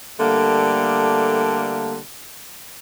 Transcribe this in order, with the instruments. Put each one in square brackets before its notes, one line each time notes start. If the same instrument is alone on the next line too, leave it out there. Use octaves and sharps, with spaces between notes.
[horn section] D3 G3 A3 A#3